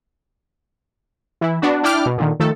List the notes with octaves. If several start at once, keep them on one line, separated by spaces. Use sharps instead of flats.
E3 E4
B3 D4 F#4
D4 E4 D5 G5 D6 F6
B2
A#2 D3 D#3
D#3 F3 A3 A4